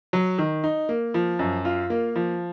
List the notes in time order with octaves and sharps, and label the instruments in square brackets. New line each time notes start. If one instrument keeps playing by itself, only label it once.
[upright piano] F#3
D#3
D#4
A#3
F3
F#2
F4
A#3
F3